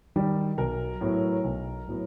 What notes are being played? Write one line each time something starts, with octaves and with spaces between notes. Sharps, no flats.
D#3 G3
B1 A#4
A2 F#3 B3
B1
A2 F#3 B3